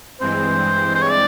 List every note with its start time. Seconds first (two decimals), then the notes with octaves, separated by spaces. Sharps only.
0.20 G2 E3 G#3 C4 C5
0.95 C5
1.03 C#5
1.10 D5